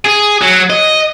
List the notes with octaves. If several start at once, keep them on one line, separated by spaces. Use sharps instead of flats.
G#4
F#3
D#5